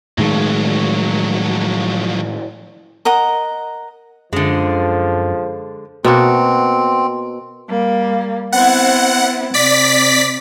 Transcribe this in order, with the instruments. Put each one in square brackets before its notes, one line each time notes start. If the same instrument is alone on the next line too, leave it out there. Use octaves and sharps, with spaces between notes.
[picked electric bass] A2 D#3 G#3 [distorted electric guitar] F3 F#3
[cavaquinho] A#4 D#5 F#5 A#5
[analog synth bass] F#2 [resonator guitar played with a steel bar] D3 G#3 [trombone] F3
[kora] B2 A#3 F#4 [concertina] C4
[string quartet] G3 A#3
[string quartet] B3 C4 E4 [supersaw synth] F#5
[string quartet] C3 [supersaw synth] D5 B6